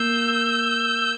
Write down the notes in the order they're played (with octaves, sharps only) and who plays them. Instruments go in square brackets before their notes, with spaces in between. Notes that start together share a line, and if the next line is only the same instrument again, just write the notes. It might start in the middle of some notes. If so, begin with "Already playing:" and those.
Already playing: [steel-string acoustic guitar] A#3 [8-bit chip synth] E6 G6